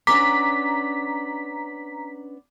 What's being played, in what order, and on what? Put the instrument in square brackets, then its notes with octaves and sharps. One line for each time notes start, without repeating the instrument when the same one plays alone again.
[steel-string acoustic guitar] B3 C#4 D4 [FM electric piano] A#5 B6 [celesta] D6